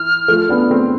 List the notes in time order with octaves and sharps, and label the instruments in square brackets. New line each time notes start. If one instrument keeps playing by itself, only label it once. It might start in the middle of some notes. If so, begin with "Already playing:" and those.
Already playing: [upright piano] E3 [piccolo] F6
[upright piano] F3 A3
B3 D4
A3 C4